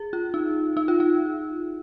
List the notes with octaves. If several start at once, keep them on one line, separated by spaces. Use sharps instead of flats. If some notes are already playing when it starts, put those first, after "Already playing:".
Already playing: G#4
F4
D#4
D#4
F4
D#4